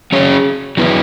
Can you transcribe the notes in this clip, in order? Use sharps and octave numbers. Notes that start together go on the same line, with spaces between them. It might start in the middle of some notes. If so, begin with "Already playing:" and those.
F#3 C#4 G#4 C#5
F#3 B3 E4 B4